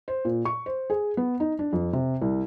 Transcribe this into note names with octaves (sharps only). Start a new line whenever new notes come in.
C5
A#2
C#6
C5
G#4
B3
D#4
D4
F2
C3
C2